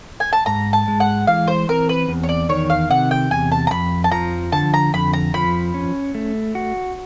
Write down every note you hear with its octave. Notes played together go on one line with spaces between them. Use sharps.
G#5
A5
G#2 A#5
A5
G#3
F#5
E3 F5
C5
C4 A#4
B4
E2
C#5
D5
D#3 C#5
F5
C3 F#5
G5
E2 G#5
A5
A#5
F2 B5
A5
F3 A#5
D3 A5
A#5
F2 B5
A#5
F3 B5
C#4
A3
F#4